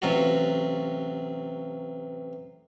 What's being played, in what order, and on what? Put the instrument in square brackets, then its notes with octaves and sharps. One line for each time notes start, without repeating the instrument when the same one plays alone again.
[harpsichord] A1 C3 F#3 F4 F#4